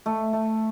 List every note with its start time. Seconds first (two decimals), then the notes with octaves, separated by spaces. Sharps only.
0.06 A3
0.33 A3